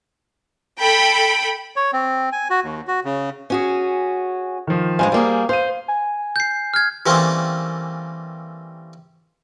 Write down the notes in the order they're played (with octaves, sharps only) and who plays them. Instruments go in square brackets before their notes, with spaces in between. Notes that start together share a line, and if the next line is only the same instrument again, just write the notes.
[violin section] A4 G5 B5
[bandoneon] C#5
C4
G#5
F#4
D#2
F#4
C#3
[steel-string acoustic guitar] C#4 F#4 G#4
[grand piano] D#3 F3
[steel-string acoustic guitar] G2 F#3 G#3 [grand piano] C5 F5 G#5
[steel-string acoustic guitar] G3 A#3 G#4
[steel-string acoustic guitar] C5 [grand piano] F5 D#7
[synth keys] G#5
[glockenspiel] G6 C7
F6 G#6
[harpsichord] E3 G3 A3 A#3 C4 C#4